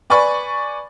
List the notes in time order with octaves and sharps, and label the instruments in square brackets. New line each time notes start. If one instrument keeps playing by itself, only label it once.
[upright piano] B4 D5 G#5 B5 C#6